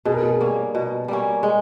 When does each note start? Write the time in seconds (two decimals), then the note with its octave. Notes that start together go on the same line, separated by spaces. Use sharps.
0.05 B2 G#4
0.14 A#4
0.23 G#4
0.40 G3 A#3 C#4
0.75 B2
1.08 G3 A#3 C#4
1.43 G#3